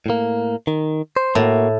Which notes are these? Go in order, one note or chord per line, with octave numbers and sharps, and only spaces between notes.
A2 A#3
D#3
C5
A2 A#3 F#4